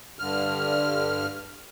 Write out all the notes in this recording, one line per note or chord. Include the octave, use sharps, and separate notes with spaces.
G2 D3 F6